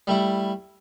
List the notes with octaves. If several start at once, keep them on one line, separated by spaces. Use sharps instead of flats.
G3 A3 E4